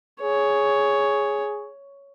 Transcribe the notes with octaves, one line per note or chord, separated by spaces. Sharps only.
G#4 C#5